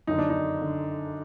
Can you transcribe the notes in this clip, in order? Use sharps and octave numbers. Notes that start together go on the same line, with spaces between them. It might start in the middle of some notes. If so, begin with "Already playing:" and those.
F#2 D3 D#4
D4
D#4
D3